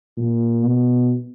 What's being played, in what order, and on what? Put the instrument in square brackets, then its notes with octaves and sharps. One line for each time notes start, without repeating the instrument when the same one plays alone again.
[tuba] A#2
B2